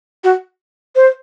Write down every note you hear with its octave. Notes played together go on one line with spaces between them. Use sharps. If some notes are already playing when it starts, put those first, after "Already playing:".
F#4
C5